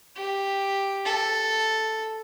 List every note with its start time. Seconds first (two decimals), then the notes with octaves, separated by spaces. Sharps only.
0.16 G4
1.05 A4